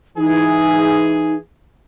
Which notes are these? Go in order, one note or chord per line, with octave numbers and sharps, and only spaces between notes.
E3 D#4 G#4